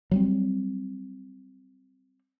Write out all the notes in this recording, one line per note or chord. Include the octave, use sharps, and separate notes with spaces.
F#3 G3 C4